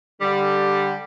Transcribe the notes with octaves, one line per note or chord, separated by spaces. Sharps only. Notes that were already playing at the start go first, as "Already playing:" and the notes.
D3 G3